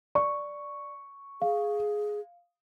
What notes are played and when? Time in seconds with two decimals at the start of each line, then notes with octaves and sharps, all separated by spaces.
0.15 D5 C#6
1.42 G#4 F5